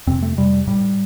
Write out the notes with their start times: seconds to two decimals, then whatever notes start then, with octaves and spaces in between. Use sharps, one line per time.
0.07 F2 C3 C4
0.22 A3
0.37 F2 C3 G3
0.67 A2 G3